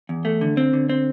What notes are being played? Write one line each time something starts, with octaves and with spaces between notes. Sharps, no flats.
E2
A3
D3
C4
D3
C4